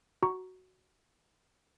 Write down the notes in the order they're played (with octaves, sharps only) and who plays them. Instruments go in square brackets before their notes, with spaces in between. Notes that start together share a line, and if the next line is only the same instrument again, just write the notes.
[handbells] F#4 A#5 C#6